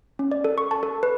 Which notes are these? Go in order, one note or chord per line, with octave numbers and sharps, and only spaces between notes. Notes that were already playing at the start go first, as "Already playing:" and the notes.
C#4
D5
A4
C#6
A5
A4
B4